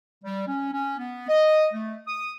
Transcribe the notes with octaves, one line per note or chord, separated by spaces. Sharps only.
G3
C#4
C#4
B3
D#5
A3
D#6